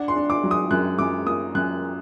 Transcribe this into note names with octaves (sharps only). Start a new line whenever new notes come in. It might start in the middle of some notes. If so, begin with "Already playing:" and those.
Already playing: D4 F#5
C6
D4
D6
F#3
D#6
F#2 F#6
F#2 D6
A#3 D#6
F#2 F#6